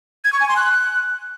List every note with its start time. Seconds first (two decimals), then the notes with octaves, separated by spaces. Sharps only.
0.25 G#6
0.33 C#6
0.40 G#5
0.48 C6
0.56 F#6